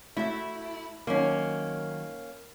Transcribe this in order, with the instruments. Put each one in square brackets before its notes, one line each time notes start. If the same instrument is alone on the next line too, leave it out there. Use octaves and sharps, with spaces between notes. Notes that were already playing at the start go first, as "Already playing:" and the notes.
[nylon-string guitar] A3 F#4 E5 [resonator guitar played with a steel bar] E4
[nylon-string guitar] D#3 F#3 [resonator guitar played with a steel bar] A#3 C#4